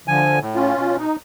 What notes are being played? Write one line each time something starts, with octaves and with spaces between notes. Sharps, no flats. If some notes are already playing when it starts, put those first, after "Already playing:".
D3 F3 G#5
A2
C#4 F4
B2
D#4